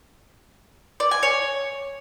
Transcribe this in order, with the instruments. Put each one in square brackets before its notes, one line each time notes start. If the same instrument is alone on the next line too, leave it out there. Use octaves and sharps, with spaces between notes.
[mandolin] D5
G#5
C#5